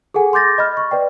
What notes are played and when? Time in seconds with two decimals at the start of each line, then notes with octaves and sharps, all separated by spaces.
0.14 G#4 A4 F#5 G#5
0.33 C6 D6 G6 A6 A#6
0.58 D#5 B5 F6
0.77 C#6
0.91 B4 D5 G5